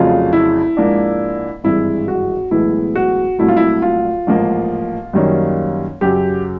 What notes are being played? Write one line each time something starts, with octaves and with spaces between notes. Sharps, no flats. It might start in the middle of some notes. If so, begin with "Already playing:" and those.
Already playing: F1 F2 C#3 F#3 F4
E4
G#2 F3 A#3 D4
G#1 G2 E3 G#3 E4
F#4
B1 A2 E3 G#3 B3 E4
F#4
C2 A#2 F#3 A3 E4
F4
E4
F4
A1 G#2 F3 A#3
F#2 D#3 G3 A#3 C#4
F#2 C#3 F#3 G4